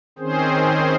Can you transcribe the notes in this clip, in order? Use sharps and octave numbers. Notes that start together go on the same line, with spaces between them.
D#3 C4 C#4 G#4 C5